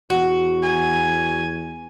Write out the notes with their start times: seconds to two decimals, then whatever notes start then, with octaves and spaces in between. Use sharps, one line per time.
0.10 E2 F#4
0.63 G#5